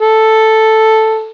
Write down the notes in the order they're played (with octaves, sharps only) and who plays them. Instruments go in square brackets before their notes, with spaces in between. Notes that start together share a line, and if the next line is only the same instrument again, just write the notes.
[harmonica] A4